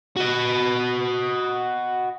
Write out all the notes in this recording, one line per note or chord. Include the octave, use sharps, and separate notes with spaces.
F#4 D#5